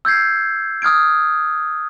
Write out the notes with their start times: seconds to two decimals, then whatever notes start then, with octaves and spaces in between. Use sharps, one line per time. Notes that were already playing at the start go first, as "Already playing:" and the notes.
0.05 E6 G6 G#6 C7
0.82 D#6 F6 G#6 D7